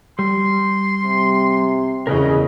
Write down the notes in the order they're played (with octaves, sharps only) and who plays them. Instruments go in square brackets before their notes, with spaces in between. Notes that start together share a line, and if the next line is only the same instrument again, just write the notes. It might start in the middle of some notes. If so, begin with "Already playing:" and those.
[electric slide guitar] G3 [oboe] C6
[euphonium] C3
[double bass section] E2 C#3 [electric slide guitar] A#4 B4 D#5